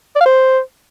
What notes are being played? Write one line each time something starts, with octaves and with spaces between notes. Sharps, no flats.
D5
F5
C5